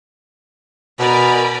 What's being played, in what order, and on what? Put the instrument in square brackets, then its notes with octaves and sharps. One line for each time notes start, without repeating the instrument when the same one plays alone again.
[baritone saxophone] B2 [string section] A#4 D5 G#5 [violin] B5